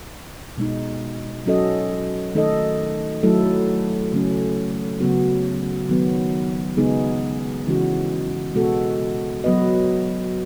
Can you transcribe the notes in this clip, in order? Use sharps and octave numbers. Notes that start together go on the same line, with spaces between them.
B2 G#3 D#4
F#3 C#4 F#4 A4 D#5
D#3 A3 D#4 A4 D#5
F#3 A3 E4 A4
C#3 F#3 A3 C#4
C#3 F#3 B3 F#4
D#3 F#3 B3
C#3 G#3 B3 D#4 G#4
C#3 E3 G#3 C#4 F#4
B2 G#3 B3 F#4 A4
F#3 B3 F#4 B4 D#5